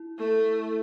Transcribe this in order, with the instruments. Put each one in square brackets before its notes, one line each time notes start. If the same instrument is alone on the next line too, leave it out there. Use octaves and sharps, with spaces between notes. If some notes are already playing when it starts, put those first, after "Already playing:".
Already playing: [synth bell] E4
[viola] A3